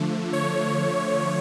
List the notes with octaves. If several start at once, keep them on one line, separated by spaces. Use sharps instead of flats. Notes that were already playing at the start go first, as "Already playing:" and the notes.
Already playing: D3 F3 A3
C#5